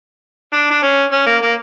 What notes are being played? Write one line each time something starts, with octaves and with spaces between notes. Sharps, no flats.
D4
D4
C#4
C#4
A#3
A#3